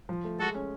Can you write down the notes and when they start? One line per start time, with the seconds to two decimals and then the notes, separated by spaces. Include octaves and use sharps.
0.09 F3
0.24 A3
0.39 G#3 F#4 A4
0.55 C#4